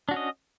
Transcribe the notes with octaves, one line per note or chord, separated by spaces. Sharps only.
C#4 D4 F#4 D#5